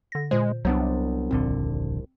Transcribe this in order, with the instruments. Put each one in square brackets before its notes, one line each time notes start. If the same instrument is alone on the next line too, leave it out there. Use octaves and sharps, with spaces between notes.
[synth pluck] D3 A#6
[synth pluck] A#2 C5 [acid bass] G#3
[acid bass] C2 [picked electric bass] F#3 B3 D4 [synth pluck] C5
[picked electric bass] D#1 A#1 D3 [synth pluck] C4